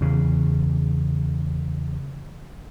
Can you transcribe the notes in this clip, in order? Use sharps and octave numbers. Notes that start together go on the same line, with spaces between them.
E2 C#3